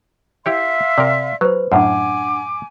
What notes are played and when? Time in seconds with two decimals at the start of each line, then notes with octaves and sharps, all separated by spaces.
0.46 E4 G4 C#5 E5 F5 C6
0.98 C3 A#4 D5
1.41 F#3 B4 C5
1.72 F#2 A2 D4 F#5 G#5 D6